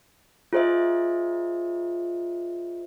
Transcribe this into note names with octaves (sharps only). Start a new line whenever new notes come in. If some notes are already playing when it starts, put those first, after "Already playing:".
F4 G#4 C5 D#5 E5